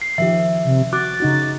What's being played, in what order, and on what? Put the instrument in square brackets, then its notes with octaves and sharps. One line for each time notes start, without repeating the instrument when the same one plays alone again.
[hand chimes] C7
[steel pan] D#3 F3 G4 [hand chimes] E5
[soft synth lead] C3
[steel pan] F#4 [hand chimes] D6 F#6 [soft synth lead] A6
[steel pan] C#3 D#4 F#4